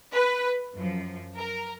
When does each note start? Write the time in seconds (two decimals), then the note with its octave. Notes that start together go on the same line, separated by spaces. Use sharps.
0.13 B4
0.74 F#2 F3
1.36 A#4